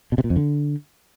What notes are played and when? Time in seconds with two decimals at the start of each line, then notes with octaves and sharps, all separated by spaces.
0.12 B2
0.18 C3
0.24 A#2
0.30 F2
0.36 D3